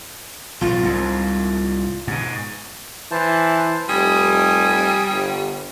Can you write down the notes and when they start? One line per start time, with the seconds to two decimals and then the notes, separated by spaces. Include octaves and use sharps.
0.61 B1 A2 F4
0.83 C2 G#2
2.07 G#2 B2
3.11 E3 C5 A5
3.89 F1 G3 G#5 D#6
5.11 G1